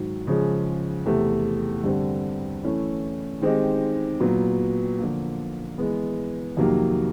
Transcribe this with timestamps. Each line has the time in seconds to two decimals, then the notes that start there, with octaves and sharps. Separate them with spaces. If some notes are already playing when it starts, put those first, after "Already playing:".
Already playing: G#2 D#3 F#3
0.27 C#3 F3 G#3
1.06 E2 C3 E3 A3
1.84 G2 D3 G3 C4
2.63 E3 A3 C#4 E4
3.41 D#3 G#3 C4 D#4 G4
4.20 A#2 F#3 B3
4.99 D3 F3 A#3
5.78 E3 G#3 B3
6.57 F2 C3 D#3 F#3 A#3